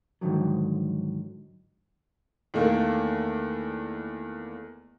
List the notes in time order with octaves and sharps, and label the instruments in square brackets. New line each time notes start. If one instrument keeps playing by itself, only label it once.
[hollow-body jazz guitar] G#2 D3 D#3 F3 F#3
[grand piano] E2 D#3 A3 A#3